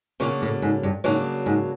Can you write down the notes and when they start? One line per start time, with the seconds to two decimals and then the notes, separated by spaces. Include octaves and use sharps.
0.20 A#2 C#3 F#3 A#3 D4
0.42 A2
0.62 G#2
0.83 G2
1.04 G#2 C#3 F#3 A#3 D4
1.46 G#2